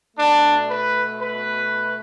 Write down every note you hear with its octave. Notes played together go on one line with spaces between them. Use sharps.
B2 A3 D4
B4
B4